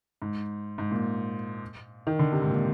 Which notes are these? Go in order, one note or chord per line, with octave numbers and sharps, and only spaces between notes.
G#2
G#2
A#2
D#3
D3
C3
G#2
A#2